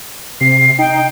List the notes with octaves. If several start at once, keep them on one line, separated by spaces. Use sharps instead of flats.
C3 C7
D#4 G5